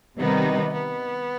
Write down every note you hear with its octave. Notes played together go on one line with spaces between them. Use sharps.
C3 D#3 G3 B3 D#4
B3